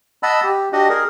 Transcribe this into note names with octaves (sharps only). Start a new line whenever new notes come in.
D#5 F#5 A5 B5 E6
G4
D4 F#4 G4 D#5 F#5
G#4 A#4